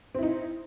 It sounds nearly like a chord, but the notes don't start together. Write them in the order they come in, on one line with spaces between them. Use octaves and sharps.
C4 E4 D#4